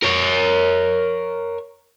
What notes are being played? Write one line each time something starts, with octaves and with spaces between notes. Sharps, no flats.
A#4 C#5